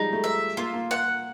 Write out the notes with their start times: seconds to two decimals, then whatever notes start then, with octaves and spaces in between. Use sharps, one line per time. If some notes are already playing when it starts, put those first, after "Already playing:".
Already playing: F3 G3 G#3 D#4
0.12 A3
0.24 E5
0.57 A#3 F4
0.73 A#3
0.91 F#5